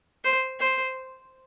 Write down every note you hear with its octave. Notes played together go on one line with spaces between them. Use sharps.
C5
C5